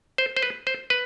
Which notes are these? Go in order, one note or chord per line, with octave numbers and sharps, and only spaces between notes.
C5
C5
B4
C5
B4